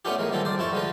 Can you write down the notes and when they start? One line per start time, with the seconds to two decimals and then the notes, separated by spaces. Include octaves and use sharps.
0.05 A3 B3 C#4 D4 F4 G4
0.19 E3 G#3 A#3
0.31 D#3 G3 C4 F4 A4
0.45 C5 D5
0.58 F2 E4 F4 A5 C#6
0.72 D3 G#3 F4 B4